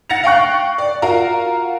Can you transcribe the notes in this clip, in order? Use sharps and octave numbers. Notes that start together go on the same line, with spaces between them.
F#5 A6 A#6 C#7 F7
F5 G5 C#6 F#6
D5
F4 F#4 A#4 F5 A#5